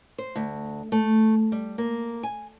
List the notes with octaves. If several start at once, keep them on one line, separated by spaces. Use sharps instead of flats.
C5
D2
A3
G3
A#3
G#5